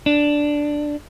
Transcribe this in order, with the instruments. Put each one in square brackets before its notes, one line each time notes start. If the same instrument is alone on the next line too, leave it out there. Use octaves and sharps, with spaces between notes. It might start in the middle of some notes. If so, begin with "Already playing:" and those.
[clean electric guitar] D4